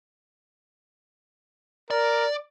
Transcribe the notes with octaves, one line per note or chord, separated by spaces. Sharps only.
A#4 D5